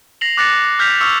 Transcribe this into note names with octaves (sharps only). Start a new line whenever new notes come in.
A#6 C7 F7 F#7
D6 F#6 A6 A#6 C#7 E7
D6
F6 G6 B6 F7
C#6 D6 E6 F6 C#7 F7